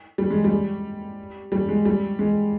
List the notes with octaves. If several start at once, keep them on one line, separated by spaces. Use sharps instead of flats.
G3
G#3
G3
G3
G#3
G3
G#3